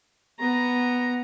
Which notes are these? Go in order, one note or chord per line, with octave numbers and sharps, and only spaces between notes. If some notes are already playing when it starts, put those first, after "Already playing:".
B3 A#5